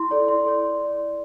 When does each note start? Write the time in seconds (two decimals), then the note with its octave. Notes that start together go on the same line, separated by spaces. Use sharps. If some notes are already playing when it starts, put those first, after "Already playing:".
Already playing: E4 C6
0.11 A4 D5
0.28 E4 C6
0.46 A4 D5